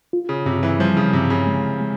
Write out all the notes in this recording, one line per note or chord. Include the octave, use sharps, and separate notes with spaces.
F4
C#3
G2 C3
E3
F3 G3
C#3
G2 C3
C#3
G#3
G#3